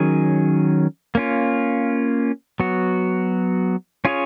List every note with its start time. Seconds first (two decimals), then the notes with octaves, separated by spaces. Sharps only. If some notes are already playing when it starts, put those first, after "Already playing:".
Already playing: D#3 F#3 C#4 G#4
1.15 A#3 C#4 F4
2.60 F#3 B3 F#4
4.05 C#4 F4 G#4 C#5